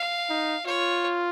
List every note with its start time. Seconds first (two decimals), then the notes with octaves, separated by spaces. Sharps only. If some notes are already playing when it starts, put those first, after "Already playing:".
Already playing: F5
0.29 D#4
0.66 F4 C#5